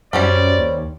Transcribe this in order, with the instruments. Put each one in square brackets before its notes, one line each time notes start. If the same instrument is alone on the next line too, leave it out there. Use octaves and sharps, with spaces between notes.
[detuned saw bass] F#2 [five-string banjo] G3 C4 C#4 [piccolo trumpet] D5
[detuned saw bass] D#2